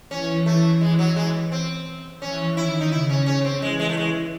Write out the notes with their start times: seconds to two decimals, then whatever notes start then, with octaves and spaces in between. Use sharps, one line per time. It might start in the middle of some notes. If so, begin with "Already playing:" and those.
0.11 E3 C#4
0.46 A3
0.81 G#3
0.99 F#3
1.16 G#3
1.52 C4
2.21 E3 C#4
2.56 D#3 E4
2.81 D#4
2.92 C#3 E4
3.10 C#4
3.26 C#4
3.45 C4
3.62 E3 G#3
3.79 G#3
3.89 A3
3.97 G#3